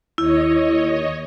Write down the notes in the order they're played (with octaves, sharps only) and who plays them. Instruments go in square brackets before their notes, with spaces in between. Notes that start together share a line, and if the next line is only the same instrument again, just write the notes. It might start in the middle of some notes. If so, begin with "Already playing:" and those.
[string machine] D#2 C#5 D#5 [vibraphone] E4